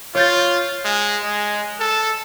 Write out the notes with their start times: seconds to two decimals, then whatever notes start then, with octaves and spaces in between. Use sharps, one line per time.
0.15 F4 C#5 G6 A6
0.85 G#3
1.23 G#3
1.80 A4